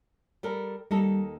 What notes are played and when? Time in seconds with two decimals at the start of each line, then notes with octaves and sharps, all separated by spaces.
0.43 G3 A4 A#4
0.91 D#2 G3 D#4 A4